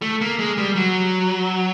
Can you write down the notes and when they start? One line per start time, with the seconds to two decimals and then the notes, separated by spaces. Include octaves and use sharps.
0.02 A3
0.21 A#3
0.39 G#3
0.58 G3
0.75 F#3